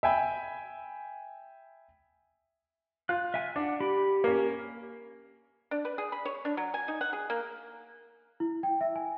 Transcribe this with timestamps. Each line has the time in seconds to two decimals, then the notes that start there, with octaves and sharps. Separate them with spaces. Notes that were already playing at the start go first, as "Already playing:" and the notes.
0.03 E5 G5 G#5 B5
3.09 F4 F#6
3.34 E5 G#5
3.56 D4 F#5
3.80 G4 B5
4.24 A#3 C#4
5.71 D4
5.85 B4
5.98 G#4
6.12 B5
6.25 C#5
6.45 D4
6.57 F#3
6.74 G#5
6.88 D#4
7.01 F#5
7.13 G#4
7.30 A#3
8.40 E4
8.63 G5
8.81 E5
8.96 G#5